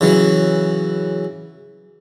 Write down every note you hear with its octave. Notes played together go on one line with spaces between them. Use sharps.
C#3 E3 F#3